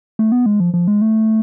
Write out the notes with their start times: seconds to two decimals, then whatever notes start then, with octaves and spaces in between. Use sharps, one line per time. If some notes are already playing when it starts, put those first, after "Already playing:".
0.19 A3
0.32 B3
0.46 G#3
0.60 F3
0.74 F3
0.88 G#3
1.01 A3